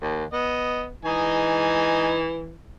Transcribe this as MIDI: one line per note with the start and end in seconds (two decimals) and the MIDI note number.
0.02 0.25 39
0.33 0.92 59
0.33 0.83 75
1.05 2.57 52
1.05 2.18 63
1.05 2.18 75
1.05 2.18 80